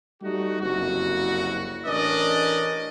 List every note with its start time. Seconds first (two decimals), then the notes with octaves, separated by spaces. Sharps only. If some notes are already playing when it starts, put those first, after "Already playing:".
0.22 G3 A3 D#4 F#4
0.60 F#1 C2 F2 F#4
1.86 A1 C#4 D4 A#4 D5 D#5